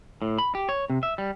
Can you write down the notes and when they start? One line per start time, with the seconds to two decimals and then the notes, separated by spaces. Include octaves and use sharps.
0.22 A2
0.38 B5
0.55 G4
0.69 C#5
0.90 C3
1.03 E5
1.18 G3